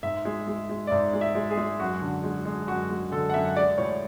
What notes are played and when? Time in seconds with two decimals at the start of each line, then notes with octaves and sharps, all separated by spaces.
0.03 G#2 E5
0.25 G#3
0.48 G#3
0.69 G#3
0.87 D5
0.91 G#2 E5
1.13 G#3
1.21 E5
1.35 G#3
1.51 G#4
1.57 G#3
1.79 F#2 F#4
2.01 D3
2.24 G#3
2.45 G#3
2.67 F#2 F#4
2.90 G#3
3.12 D3 A4
3.30 F#5
3.34 F#2 E5
3.56 G#3 D5
3.78 A2 C#5